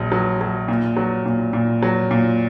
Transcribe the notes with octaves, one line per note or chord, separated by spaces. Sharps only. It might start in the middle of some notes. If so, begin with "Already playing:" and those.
Already playing: A#1 F#3
F#3
F#3
A#2
F#3
A#2
A#2
F#3
A#2